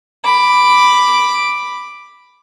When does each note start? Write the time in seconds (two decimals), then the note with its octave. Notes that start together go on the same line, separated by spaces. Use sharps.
0.25 B5 D6